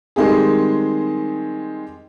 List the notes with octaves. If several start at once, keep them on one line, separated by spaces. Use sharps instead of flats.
D#3 G3 G#3 C4 G4 G#4